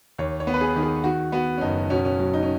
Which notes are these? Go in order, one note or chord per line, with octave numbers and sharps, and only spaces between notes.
D#2 C#5
C#5
B3
B4
G#4
D#3
G#4
D#3 F#4
B3 F#4
C#4
F#1 D#4
B2 C#4
C#4
F#3
D#4
C#4